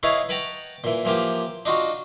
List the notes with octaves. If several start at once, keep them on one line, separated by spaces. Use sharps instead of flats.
D#4 E4 G#4 B4 C#5 F5
B4 F#5 G5 A5 A#5
A#2 E3
E3 F3 A#3 G4
D4 D#4 F4 F#4